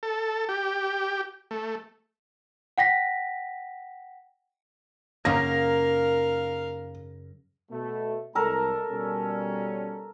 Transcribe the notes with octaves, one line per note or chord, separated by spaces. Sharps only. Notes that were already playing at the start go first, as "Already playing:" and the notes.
A4
G4
A3
F#5 G5 A#6 B6
F#2 C#3 A#3 D#4 A#4 F5 A#6
B2 A3
C2 G#3 A4 A#4 A#5
B2 G3 C#4